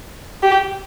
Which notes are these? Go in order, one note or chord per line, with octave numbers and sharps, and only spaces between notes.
G4